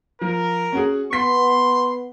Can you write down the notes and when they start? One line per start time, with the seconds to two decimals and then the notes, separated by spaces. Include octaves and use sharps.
0.21 F3 A#4
0.72 C#4 F#4 G#4
1.13 B3 C6 B6